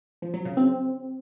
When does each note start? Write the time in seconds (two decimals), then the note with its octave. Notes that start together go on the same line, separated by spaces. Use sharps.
0.22 F3
0.34 F#3
0.45 C#3
0.57 C4